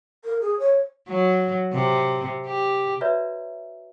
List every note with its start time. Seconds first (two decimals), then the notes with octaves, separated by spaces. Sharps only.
0.25 A#4
0.41 G#4
0.59 C#5
1.09 F#3
1.73 C3
2.46 G4
3.01 F#4 B4 C#5 D5 E5 A#5